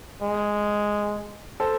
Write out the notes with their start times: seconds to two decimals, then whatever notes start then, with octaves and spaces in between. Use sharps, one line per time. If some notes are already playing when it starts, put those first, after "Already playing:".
0.22 G#3
1.60 A4 C5